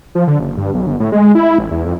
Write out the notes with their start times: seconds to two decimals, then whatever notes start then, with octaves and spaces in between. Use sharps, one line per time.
0.15 F3
0.27 D3
0.39 F#1
0.57 G2
0.74 B1
0.87 G1
1.00 A2
1.12 G#3
1.35 E4
1.59 A1
1.71 E2
1.86 F2